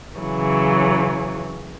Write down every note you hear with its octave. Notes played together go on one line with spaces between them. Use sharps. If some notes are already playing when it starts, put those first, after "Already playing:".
C#3 E3 F#3